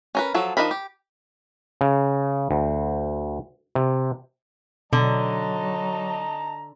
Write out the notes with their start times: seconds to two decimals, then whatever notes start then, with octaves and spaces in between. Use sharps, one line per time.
0.15 C#4 A#4 B4
0.34 F3 F#3 A4
0.57 F3 D4 D#4 A#4 B5
0.71 G4
1.81 C#3
2.51 D2
3.75 C3
4.93 B2 D3 F#3 D#5 A5 A#5